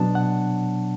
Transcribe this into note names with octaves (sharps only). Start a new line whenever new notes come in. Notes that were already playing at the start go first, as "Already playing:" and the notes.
Already playing: B2 F#3 B3 D4 A5
F#5